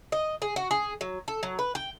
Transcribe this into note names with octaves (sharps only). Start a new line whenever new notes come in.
D#5
G#4
F#4
G#4
F#3
A4
F#3
B4
G5